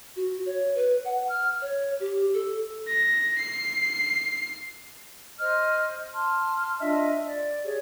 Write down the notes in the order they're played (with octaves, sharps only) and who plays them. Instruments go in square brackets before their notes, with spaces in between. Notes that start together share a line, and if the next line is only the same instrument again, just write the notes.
[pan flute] F#4
C#5
B4
F#5
F6
C#5
G4
A4
[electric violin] A#6
C7
[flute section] C5 D#5 F6
A5 C6 F6
D4 F4 D#5 E5
D5
G4 G#4 C#5